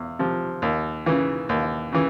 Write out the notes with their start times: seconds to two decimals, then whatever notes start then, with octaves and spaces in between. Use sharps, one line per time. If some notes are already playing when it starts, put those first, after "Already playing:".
Already playing: E2
0.19 C3 F3
0.62 D#2
1.06 C#3 E3
1.49 D#2
1.92 C#3 E3